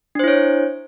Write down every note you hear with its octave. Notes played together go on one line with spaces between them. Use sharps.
D4 E4 C5 C#5